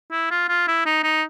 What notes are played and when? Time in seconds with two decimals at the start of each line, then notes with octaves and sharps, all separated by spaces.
0.11 E4
0.31 F4
0.49 F4
0.68 E4
0.86 D#4
1.03 D#4